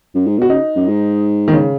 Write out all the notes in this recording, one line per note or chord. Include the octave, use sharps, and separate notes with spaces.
F#2
G#2
B2 F#4
C#3 D#4
F#2
G#2
D#3
C#3